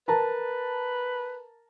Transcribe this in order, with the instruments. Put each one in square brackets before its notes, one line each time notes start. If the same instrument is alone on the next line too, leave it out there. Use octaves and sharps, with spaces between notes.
[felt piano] A#4 A5 A#5 [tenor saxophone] B4